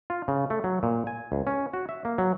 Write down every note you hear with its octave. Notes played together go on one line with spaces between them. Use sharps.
F4
C#3
A3
F#3
A#2
G#5
C#2
C#4
F#4
E5
A#3
F#3